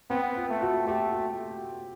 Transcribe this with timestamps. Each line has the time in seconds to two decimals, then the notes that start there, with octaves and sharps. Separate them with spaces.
0.10 B3 C4
0.36 F4
0.49 A3
0.62 F#4
0.87 A3 G4
1.13 F#4